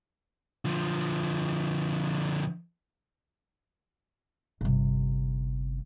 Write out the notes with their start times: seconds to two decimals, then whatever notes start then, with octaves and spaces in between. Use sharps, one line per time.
0.65 D3 F3
4.61 G1 C3